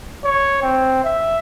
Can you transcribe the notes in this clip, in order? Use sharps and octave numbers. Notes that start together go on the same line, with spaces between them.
C#5
C4
E5